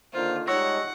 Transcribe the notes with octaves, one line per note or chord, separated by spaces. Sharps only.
D3 D#3 A#3 F4 C5
G3 G#3 D#4 C#5 F#5 C#6 E6 A#6